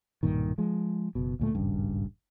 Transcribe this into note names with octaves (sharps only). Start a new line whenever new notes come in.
B1 G2 A#2 D#3
F3 G#3
F#1 B2
D2 A#2 A3
D#1 G#1 G2 C#3